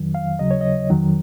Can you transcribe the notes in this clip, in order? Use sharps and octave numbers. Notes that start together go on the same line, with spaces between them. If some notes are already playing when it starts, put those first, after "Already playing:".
Already playing: F2 D#3 F#3
F5
D#2 C#3 F#3 D#5
C#5
D#5
F2 D#3 F#3